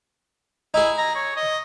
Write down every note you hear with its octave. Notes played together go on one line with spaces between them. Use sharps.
D#4 E4 G#4
A#5
C#5
D#5